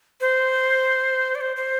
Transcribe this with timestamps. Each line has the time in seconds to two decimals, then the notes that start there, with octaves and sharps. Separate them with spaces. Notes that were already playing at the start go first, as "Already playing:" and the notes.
0.21 C5
1.35 D5
1.41 C5
1.56 C5